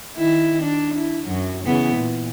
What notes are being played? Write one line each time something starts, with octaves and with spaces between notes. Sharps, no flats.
D#3 E4
D4
E4
F#2 F#3
C#3 E3 B3
A#2